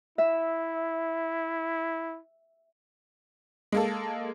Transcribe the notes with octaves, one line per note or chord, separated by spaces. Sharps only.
E4 E5
G#3 A#3 A4